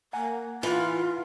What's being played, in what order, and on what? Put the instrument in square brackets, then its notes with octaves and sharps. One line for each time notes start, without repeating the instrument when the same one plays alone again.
[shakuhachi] A#3 [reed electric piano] F#5 G#5 A#5
[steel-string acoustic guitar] E3 [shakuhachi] F4